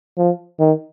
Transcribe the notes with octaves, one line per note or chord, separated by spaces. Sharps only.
F3
D#3